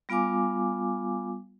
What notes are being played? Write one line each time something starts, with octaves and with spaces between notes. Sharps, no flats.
G3 B3 F4 F5 G#5 D6